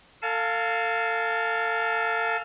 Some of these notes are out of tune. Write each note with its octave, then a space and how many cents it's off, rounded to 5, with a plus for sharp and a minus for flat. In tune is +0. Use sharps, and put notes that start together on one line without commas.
A4 +35 F5 +0 A5 -45